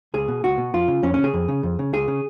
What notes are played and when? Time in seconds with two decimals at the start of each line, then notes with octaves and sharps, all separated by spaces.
0.14 C#2 G#4
0.28 B2
0.43 C#2 F#4
0.58 B2
0.74 F2 F4
0.88 C#3
1.03 F2 C#4
1.14 C#3 C#4
1.24 G#4
1.34 F2
1.48 C#3
1.63 F2
1.79 C#3
1.93 C#2 G#4
2.08 C#3